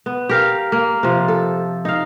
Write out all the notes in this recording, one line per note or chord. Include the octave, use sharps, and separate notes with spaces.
B3
G4 A#4 F5
A#3
C3 F3
A4
D#4 F5